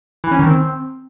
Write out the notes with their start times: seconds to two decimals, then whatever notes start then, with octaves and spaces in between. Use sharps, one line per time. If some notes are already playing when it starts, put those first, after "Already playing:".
0.24 E3
0.31 C#4
0.39 D#3
0.47 C4